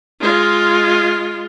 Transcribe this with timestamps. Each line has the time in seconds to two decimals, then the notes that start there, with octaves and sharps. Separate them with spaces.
0.20 G#3 F4